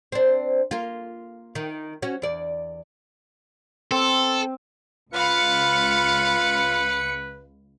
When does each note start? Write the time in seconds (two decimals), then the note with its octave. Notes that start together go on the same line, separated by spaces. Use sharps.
0.12 C4 D4
0.71 A#3 F4
1.55 D#3
2.02 C#4 F#4
2.22 E2 D5
3.91 C4 A4
5.13 C#2 F4 B4 F5 B5 C#7